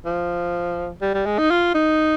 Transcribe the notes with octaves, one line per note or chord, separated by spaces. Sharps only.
F3
G3
G3
G#3
D#4
F4
D#4